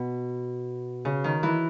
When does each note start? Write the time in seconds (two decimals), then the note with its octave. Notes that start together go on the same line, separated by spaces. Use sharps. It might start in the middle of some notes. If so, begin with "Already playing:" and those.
Already playing: B2
1.05 C#3
1.24 D#3
1.43 E3